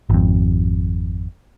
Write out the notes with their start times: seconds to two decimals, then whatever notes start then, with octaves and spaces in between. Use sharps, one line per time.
0.10 G#1 F2